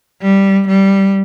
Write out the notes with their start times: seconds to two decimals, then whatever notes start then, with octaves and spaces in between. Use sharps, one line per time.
0.22 G3
0.68 G3